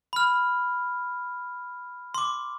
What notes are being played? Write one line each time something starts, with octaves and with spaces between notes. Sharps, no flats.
B5 F6
C6 D6